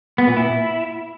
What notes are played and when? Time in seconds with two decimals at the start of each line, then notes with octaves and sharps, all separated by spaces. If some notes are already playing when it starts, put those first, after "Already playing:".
0.18 B3
0.27 A#2
0.37 E4